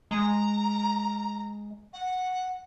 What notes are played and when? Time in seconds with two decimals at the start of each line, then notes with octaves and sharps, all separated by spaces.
0.11 G#3 A#5
1.93 F#5